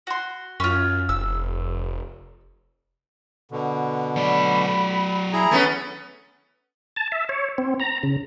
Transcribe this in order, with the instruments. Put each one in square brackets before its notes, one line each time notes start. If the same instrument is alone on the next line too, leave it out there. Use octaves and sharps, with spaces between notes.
[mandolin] F#4 C6
[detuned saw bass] F#2 [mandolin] C#4 F4
[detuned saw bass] F1 [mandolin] E6
[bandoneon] B2 D3
[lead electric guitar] F#3 D5 [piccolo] B5
[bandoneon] E4 G#4 A#5
[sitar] A3 B3 C#4
[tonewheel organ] A5
E5
C#5
C4
A#5
C#3